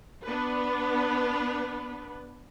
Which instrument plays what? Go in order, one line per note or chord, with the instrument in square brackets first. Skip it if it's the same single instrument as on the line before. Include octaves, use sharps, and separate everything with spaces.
[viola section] B3 D4 B4